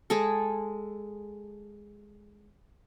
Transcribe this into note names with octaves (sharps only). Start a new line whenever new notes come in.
G#3 G#4 A4